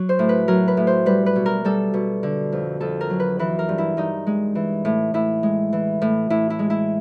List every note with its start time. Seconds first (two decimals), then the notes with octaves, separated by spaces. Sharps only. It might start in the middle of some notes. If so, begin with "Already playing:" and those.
Already playing: F#3
0.09 C5
0.19 A2
0.29 B4
0.48 F#3 A#4
0.68 B4
0.77 A2
0.87 C5
1.06 G3 B4
1.26 B4
1.36 B2
1.46 A#4
1.65 G3 A4
1.94 B2
2.23 D3
2.52 F2
2.80 F2 A4
3.01 A#4
3.10 F#3
3.20 B4
3.39 E3 B4
3.59 A#4
3.69 G2
3.78 E4
3.97 G2 D#4
4.27 G#3
4.55 E3
4.85 A2
5.14 A2 E4
5.43 G#3
5.73 E3
6.02 A2
6.30 A2 E4
6.50 E4
6.59 G#3
6.70 E4